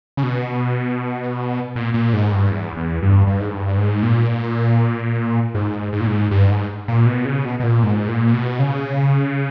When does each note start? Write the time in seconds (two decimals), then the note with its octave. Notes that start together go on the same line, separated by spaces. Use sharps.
0.17 C#3
0.23 B2
1.76 A#2
1.94 A#2
2.13 G#2
2.32 G2
2.51 E2
2.76 E2
3.02 G2
3.27 G2
3.40 G#2
3.53 G2
3.77 G#2
4.03 A#2
5.55 G#2
5.93 G#2
6.00 A#2
6.07 G#2
6.31 G2
6.50 G#2
6.88 A#2
7.06 B2
7.25 C#3
7.45 B2
7.60 B2
7.63 A#2
7.83 G#2
8.09 A#2
8.34 B2
8.59 C#3